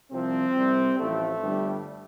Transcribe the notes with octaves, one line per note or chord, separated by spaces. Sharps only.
C2 C3 F3 C4
C2 C3 G3
A1 A2 F3 A3
G1 G2 G3